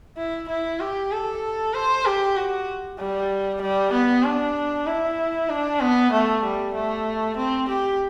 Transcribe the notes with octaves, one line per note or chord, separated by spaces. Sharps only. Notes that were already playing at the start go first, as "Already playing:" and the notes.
E4
E4
G4
A4
C5
G4
F#4
G3
G3
B3
D4
E4
D4
B3
A3
G3
A3
C4
G4